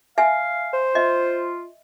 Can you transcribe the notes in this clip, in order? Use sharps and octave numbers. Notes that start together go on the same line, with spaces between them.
E5 F5 G#5
C5
F4 D#5 E5